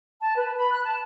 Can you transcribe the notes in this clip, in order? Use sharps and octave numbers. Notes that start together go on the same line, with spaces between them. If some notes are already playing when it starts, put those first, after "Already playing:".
A5
B4
B5
F#6
A5